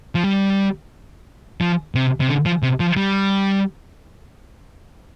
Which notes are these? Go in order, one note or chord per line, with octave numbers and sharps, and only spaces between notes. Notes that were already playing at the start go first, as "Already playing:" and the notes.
F3
G3
F3
C3
C3
D3
F3
C3
F3
G3